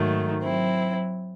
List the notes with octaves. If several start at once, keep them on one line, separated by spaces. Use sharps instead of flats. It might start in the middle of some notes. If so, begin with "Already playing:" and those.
Already playing: G#2 D#3 F#3 A3
F#3 C4 E4